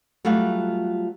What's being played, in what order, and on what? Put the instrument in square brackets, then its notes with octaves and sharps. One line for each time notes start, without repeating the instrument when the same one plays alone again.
[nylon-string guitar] F#3 G3 A3 F4 F#5